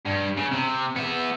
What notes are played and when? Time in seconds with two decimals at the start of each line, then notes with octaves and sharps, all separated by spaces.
0.05 G2
0.37 C#3
0.51 C3
0.96 B3 E5